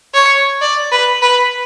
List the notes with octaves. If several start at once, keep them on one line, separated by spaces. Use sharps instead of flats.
C#5
D5
B4
B4